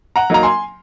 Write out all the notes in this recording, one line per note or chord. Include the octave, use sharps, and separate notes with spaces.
F#5 A#5
F#3 A#3 D#4 A#5
G#5 C6